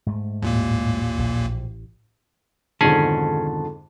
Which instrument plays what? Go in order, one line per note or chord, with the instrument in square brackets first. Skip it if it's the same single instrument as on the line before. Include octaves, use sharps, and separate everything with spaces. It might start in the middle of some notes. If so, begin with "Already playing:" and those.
[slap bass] G#2 A3
[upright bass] A1 [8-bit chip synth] D#2 A#2 A#3
[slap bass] A#1
[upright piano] F2 G#2 D3 [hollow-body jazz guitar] B2 D#3 [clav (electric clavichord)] C#4 G#4 [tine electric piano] A5